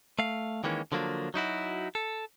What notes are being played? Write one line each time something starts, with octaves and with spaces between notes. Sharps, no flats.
A3 F5
D#3 E3 G#3 A#3 C#4
D3 F3 F#3 A#3 D4
F#3 D#4 E4 F#4
A4